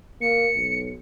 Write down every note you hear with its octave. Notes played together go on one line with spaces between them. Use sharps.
A#3 C#7
B1